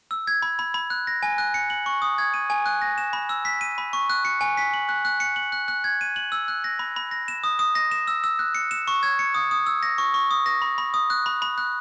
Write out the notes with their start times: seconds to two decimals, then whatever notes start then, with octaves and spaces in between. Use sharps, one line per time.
0.11 E6
0.27 G#6
0.42 B5
0.59 B5
0.74 B5
0.90 F#6
1.07 A#6
1.23 G#5
1.38 F#6
1.54 C#7
1.70 F#7
1.86 C#6
2.02 D#6
2.18 G#6
2.34 D#7
2.50 G#5
2.66 F#6
2.82 A#6
2.98 E7
3.13 B5
3.29 E6
3.45 B6
3.61 D#7
3.78 B5
3.93 C#6
4.10 F#6
4.25 C#7
4.41 G#5
4.57 B6
4.74 F#7
4.89 F#6
5.05 F#6
5.20 C#7
5.36 F#7
5.52 F#6
5.68 F#6
5.84 G#6
6.01 D#7
6.16 F#7
6.32 E6
6.48 F#6
6.64 A#6
6.79 B5
6.96 B5
7.11 A#6
7.28 E7
7.44 D#6
7.59 D#6
7.75 A#6
7.91 E7
8.07 E6
8.24 E6
8.39 F#6
8.55 C#7
8.71 E7
8.88 C#6
9.03 G#6
9.19 C#7
9.34 D#6
9.51 D#6
9.66 E6
9.83 A#6
9.98 C#6
10.14 C#6
10.31 D#6
10.46 A#6
10.62 B5
10.78 B5
10.94 D#6
11.10 F#6
11.26 B5
11.42 B5
11.58 F#6